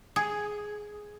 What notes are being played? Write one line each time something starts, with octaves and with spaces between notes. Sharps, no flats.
G#4